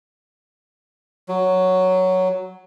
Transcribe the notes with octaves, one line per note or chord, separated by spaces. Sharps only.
F#3